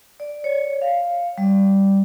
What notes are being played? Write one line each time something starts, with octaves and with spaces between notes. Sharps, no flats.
D5
C#5
F5
G3